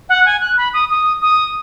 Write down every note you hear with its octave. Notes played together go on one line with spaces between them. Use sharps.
F#5
G#5
F#6
B5
D#6
D#6
D#6